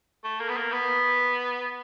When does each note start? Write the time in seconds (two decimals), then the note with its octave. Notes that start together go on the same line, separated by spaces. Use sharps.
0.24 A3
0.40 A#3
0.49 B3
0.57 A#3
0.72 B3